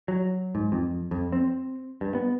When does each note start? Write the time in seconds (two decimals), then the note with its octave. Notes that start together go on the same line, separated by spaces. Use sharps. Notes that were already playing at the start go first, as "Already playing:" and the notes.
0.08 F#3
0.55 G#2
0.72 F2
1.11 F2
1.32 C4
2.01 G2
2.15 B3